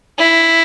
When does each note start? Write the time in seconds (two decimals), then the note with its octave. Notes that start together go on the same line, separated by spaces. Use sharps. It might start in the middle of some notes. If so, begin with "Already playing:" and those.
0.19 E4